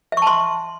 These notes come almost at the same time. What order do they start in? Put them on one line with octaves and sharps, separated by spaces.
E5 C#6 A5 C6